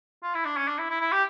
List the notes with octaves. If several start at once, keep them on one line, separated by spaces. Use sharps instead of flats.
F4
E4
D4
C#4
D4
E4
E4
E4
G4